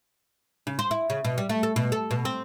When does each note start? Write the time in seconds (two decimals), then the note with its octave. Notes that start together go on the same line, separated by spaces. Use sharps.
0.67 C#3
0.79 C5
0.91 E4
1.10 C#3
1.25 B2
1.38 G3
1.49 A3
1.63 A4
1.76 B2
1.92 A4
2.11 B2
2.25 C4